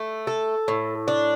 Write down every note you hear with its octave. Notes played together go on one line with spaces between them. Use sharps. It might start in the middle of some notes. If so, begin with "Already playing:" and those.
Already playing: A3
A4
A2
D4